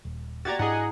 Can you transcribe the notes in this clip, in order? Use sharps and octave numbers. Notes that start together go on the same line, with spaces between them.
D#1
F#4 G4 D5 A#5 G#6 A6
G#2 D4 E4 G#4 D#5 F#5 A#5